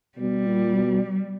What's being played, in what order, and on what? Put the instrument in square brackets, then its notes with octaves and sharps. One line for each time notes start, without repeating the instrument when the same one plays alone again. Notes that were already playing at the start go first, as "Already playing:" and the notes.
[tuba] B2 [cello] G3
[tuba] A#2
B2